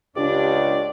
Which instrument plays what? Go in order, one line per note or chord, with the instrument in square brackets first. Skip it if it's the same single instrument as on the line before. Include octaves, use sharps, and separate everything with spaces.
[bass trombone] C#2 [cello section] D4 [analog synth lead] G4 [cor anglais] D5